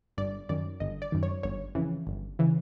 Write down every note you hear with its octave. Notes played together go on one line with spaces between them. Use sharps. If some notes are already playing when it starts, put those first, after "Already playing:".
G1 D5
F#2 D#3 D5
G1 D#5
D5
F#2 D#3
C#5
G1 C#5
F2 C#3 E3
G1
C#3 E3